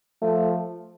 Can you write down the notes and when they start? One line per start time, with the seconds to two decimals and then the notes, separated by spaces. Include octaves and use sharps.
0.22 F3 A3